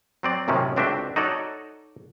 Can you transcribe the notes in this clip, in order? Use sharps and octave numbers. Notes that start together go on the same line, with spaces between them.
F#3 C4 D5
F#2 A2 C3 D#3 C#4
C#2 C4 D4 F#4 E5 G5
D#4 F#4 A4 C#5 D5